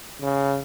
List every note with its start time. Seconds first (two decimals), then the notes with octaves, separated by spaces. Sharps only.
0.21 C#3